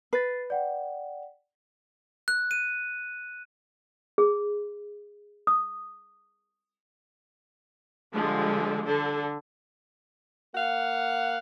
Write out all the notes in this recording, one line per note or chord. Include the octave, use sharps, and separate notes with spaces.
B4 A6 C7
D5 F#5 G5
F#6
D#7
G#4
D#6
D3 F3 G3 G#3
D3 A4
A#3 F5 F#5